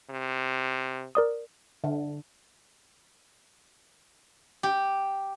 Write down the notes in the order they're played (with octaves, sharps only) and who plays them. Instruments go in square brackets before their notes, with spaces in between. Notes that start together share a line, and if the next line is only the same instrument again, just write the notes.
[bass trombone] C3
[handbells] A#4 D5 D#6
[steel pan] D3
[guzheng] G4